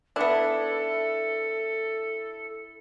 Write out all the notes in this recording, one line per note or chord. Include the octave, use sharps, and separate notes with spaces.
B3 D4 E4 A4